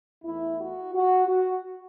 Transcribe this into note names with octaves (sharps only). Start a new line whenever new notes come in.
E2 E3 A3 E4
F#4
F#4
F#4